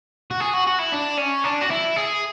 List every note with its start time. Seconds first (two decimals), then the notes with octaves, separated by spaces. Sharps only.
0.31 F#4
0.40 G#4
0.54 F#4
0.67 F#4
0.79 E4
0.93 D4
1.18 C#4
1.44 D4
1.61 F#4
1.70 E4
1.96 G#4